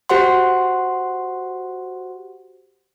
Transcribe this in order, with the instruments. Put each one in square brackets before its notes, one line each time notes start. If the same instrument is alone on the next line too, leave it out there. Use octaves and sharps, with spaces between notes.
[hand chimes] F#4 G4 C5 F#5 C6